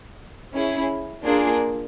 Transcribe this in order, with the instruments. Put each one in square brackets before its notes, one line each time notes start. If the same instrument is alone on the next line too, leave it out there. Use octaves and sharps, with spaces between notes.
[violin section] C#4 E4 G#4
A#3 D4 F4 G#4